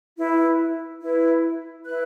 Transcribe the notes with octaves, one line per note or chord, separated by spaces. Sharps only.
E4 B4
E4 B4
E4 B4 F#6